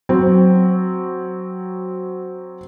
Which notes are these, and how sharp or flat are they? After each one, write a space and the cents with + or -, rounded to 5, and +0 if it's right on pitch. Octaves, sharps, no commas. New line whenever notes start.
F#3 +0 C4 +0